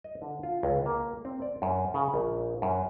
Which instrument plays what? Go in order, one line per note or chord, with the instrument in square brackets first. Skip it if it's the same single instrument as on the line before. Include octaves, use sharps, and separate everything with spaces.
[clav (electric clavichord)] D#5
D3
F4
C#2
A#3
C4
D5
F#2
C#3
A#1
F#2